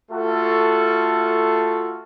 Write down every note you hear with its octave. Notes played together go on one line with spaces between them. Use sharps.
A3 F4 F#4 A4